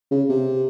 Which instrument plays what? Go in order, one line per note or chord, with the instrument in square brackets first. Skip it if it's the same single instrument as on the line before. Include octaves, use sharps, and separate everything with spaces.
[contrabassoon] C#3
C3